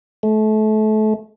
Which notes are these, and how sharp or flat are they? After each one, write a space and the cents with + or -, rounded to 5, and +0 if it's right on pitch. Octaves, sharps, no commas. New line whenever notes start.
A3 -30